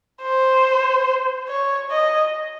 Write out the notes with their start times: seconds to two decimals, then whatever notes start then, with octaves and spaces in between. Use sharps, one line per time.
0.22 C5
1.48 C#5
1.91 D#5